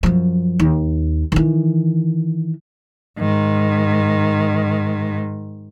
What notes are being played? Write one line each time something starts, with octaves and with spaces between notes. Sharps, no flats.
F#2 F3
D#2
D#3 E3
G#2 D#3